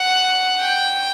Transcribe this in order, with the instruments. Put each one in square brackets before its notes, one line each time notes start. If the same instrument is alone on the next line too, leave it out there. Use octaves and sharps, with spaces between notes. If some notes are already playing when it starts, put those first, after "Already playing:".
Already playing: [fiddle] F#5
G5